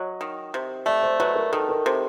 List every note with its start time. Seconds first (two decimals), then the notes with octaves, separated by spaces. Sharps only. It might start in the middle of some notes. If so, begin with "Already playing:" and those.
Already playing: F#3 D#5
0.21 D#3
0.54 C3
0.86 A3 D5
1.03 C5
1.20 F#3 B4
1.35 A#4
1.52 D#3 A4
1.69 A#4
1.86 C3